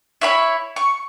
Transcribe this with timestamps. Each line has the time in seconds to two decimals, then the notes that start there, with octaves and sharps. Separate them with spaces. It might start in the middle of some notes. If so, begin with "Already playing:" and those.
0.21 E4 C#5 B5
0.76 C#6